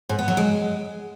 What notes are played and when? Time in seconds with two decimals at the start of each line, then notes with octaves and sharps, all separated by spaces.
0.09 G#2
0.19 B3
0.28 F#3
0.37 G#3